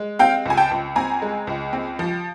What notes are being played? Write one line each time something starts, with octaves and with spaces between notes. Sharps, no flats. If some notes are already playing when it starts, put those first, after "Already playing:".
Already playing: G#3
C4 F5 G5
C#2 G#5
G5 A5
C#2
C4 G#5 A#5
G#3
C#2
C4
F3